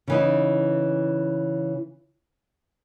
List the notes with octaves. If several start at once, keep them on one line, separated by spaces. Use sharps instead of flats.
C#3 E3 D#4